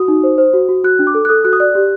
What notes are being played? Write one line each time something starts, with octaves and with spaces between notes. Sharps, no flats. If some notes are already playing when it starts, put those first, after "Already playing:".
Already playing: F#4 D#6
D#4
C5
C5
F#4
F#4
F#4 F#6
D4
D6
A4
F#6
A4 D#6
F#4 F#6
D#6
D5 F#6
G4